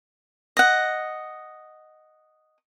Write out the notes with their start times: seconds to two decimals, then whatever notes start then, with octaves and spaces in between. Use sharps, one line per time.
0.57 D#5 F#5